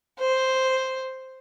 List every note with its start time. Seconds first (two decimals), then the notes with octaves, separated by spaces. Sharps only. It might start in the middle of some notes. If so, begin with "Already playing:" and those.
0.20 C5